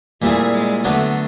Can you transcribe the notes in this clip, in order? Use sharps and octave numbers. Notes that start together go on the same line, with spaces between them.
A#2 G3 A3 C4 E4 G#4
G#3
D3 F#3 A3 B3 D4